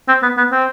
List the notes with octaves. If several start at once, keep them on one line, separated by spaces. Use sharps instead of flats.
C4
B3
B3
C4